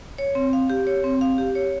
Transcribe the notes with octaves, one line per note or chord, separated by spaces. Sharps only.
C#5
C4
F5
G4
C#5
C4
F5
G4
C#5